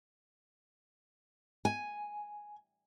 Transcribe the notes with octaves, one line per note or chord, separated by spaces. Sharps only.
G#5